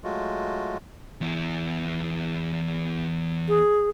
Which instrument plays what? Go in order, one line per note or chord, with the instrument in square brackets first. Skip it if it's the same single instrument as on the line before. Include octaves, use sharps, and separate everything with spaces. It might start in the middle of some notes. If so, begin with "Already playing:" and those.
[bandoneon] F#3 G#3 A3 F4 F#4
[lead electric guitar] E2 E4
[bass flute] G#4